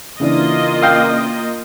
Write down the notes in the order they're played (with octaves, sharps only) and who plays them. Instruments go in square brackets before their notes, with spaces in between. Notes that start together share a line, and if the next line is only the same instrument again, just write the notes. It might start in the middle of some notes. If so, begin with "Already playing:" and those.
[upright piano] C#3 E3 D4 [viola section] A#3 F4 D#5
[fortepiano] F5 G5